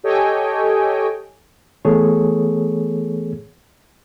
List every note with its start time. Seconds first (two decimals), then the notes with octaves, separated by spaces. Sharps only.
0.04 G4 A4 C#5 D#5 G5 G#5
1.85 E3 A3 B3 G#4 A4 C#5